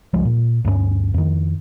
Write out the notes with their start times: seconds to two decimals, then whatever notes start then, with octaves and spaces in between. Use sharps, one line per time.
0.14 C#2 F3 G3 G#3
0.25 A#2
0.65 D2 G2 G#3 C#4
1.14 F2 D#3